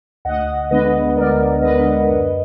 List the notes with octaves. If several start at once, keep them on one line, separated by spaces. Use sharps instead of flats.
D2 D#5 F#5
D3 G#3 B3 D4 B4 D#5
D2 A#4 D5
D3 G#3 B3 D4 B4 D#5
F#2